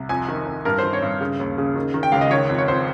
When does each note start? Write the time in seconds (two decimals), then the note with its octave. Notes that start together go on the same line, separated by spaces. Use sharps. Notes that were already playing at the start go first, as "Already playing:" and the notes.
Already playing: C2
0.09 F2 G#5
0.29 D#3
0.47 F2
0.65 G2 A#4
0.79 C5
0.84 D#3
0.93 C#5
1.02 G2
1.21 C#3
1.40 D#2
1.58 C#3
1.76 D#3
1.94 D#3
2.03 G5
2.12 C#2 F5
2.21 D#5
2.31 D#3 C#5
2.50 F2
2.58 C#5
2.68 F2 C5